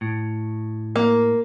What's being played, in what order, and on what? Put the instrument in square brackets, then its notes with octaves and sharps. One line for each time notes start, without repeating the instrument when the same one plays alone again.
[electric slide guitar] A2
[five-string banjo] A#3